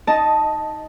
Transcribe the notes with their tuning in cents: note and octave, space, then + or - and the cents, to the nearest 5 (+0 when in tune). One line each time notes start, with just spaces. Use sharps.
D#4 +15 D#5 +0 A5 +0